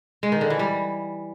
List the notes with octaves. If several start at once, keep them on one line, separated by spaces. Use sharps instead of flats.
G#3
D#3
D3
E3
G3